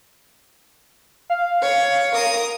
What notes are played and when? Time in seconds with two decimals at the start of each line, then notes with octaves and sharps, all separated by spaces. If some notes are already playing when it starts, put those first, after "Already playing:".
1.30 F5
1.61 C#5
2.14 A#4 D#6